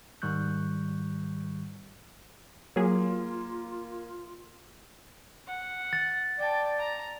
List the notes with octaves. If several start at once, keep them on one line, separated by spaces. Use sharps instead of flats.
G#2 D#3 G3 C#6 F#6 G6
F#3 A#3 F4 G#4
F#5
A6
D5 G5 A5
A#5